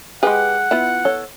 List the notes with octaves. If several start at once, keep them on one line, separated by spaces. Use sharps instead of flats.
G#3 G4 G#4 B4 F#5 G5
B3 E4 F4
A4 C#5